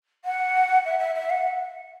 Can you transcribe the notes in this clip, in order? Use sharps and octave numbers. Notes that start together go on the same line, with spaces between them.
F#5
E5
E5
E5
F#5